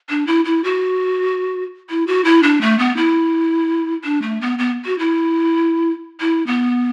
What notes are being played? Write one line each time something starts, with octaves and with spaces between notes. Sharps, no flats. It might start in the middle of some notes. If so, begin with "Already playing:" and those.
D4
E4
E4
F#4
E4
F#4
E4
D4
A3
B3
E4
D4
A3
B3
B3
F#4
E4
E4
B3